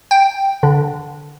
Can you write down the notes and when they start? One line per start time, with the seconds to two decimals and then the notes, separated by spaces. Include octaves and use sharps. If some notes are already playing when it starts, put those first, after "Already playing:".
0.11 G5
0.63 D3